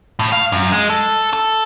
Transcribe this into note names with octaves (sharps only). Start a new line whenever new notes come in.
A2
F5
F#2
G#3
A4
A4